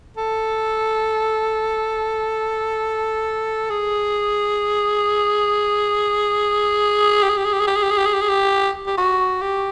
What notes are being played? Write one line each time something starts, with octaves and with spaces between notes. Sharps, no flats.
A4
G#4
G4
G#4
G4
G#4
G4
G#4
G4
G#4
G4
G#4
G4
G#4
G4
G#4
G4
G4
F#4
G4